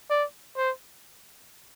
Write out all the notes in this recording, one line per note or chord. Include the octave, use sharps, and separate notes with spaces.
D5
C5